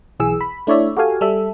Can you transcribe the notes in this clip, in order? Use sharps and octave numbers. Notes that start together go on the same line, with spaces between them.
B1 E3 G#4 E6
B5
A3 D4 E4 C#5 D5 E5
F#4 G4 A4 F5 G#5
G3 A4 E5